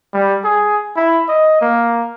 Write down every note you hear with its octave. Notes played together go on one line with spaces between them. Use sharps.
G3
G#4
E4
D#5
A#3